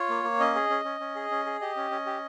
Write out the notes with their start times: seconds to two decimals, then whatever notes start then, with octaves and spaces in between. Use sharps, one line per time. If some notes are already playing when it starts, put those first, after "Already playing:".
Already playing: F4 C#5
0.10 A#3
0.24 A#3
0.40 C#4 D#5
0.55 G#4
0.70 C#4
0.85 C#4
1.00 C#4
1.16 G#4
1.31 C#4
1.46 G#4
1.61 G4 D#5
1.76 C#4
1.91 C#4
2.06 G4